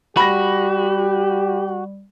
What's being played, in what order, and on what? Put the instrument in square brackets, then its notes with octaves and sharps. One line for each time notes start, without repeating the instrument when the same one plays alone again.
[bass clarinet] G3 [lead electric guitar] F#4 [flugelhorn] G4 [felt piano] B5 A#6